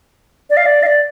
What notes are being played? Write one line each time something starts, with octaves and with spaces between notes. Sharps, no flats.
D5
F5
D5
F5
D5